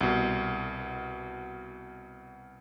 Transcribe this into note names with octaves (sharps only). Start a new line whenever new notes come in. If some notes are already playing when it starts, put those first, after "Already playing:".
C2 B2